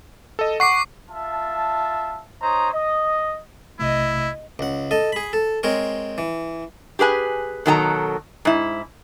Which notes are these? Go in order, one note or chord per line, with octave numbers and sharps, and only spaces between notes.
A4 D#5
F#5 C#6 D6 C7
F4 E5 A5
D#4 C5 C#5 A#5 D#6
D#5
B1 C3 A3 E4 D#5
C#2 F#5
A4 D#5
G#4 B5
A4
G#3 C4 A#4 C#5
E3
G4 G#4 B4 G#5
B2 D#3 F#3 A4 G#5 A#5
G#2 E4